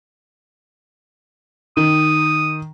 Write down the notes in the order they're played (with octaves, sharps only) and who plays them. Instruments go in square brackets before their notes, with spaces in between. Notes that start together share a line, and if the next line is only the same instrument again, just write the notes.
[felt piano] D#3 [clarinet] D#6